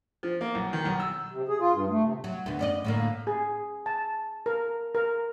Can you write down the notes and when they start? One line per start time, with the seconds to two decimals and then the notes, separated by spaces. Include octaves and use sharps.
0.23 F3
0.41 A#3
0.55 B1
0.73 D#3
0.85 B1
1.00 E6
1.31 C3
1.49 G#4
1.60 F4
1.73 G2
1.90 A3
2.02 C3
2.24 F#3
2.46 D2 B3
2.59 F#2 D5 D#5
2.84 A2 D3 A#3
3.27 G#4
3.86 A5
4.46 A#4
4.95 A#4